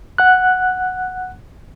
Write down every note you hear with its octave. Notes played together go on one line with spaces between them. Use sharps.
F#5 F#6